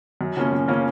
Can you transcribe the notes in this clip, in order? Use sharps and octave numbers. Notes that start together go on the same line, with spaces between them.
F#2
C#3 F3 A#3 C#4
F#2
C#3 F3 A#3 C#4